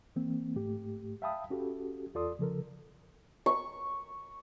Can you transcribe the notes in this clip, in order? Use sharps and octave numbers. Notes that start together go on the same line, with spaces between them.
E3 A#3 C4
G#2 A3 G4
E5 F5 G5 A5 B5 D#6
C#4 F#4 G4 A4
E2 F4 A4 D5 C6 D#6
C#3 F3 A4 A#4
C#6